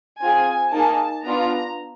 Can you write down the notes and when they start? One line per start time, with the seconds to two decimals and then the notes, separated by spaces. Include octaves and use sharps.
0.20 C4 F4 G#4 G#5
0.73 A#3 D#4 G#4 A5
1.25 B3 D4 F4 A#5